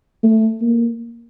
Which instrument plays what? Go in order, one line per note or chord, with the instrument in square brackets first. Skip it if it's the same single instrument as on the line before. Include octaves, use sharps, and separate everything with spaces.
[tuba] A3
A#3